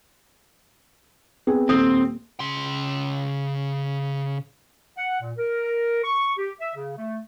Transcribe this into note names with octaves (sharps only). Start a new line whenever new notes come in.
B3 C4 G#4
D#1 C4 A4 D#6
C#3 C6
F#5
A#2
A#4
C#6
G4
E5
C#3
A3